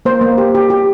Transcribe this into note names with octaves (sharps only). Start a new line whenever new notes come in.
A#3 C5
A#3
G4
G4
G4